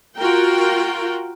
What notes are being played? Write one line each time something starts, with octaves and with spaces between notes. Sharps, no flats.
F4 F#4 A#4 G5